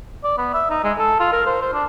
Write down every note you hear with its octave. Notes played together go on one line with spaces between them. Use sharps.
D5
B3
E5
D#4
G#3
A4
F4
A#4
C5
C5
D4